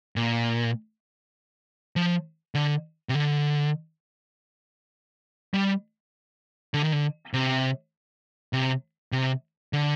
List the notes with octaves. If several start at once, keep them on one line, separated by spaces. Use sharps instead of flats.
A#2
F3
D3
C3
D3
G3
D3
D#3
D3
C3
C3
C3
D3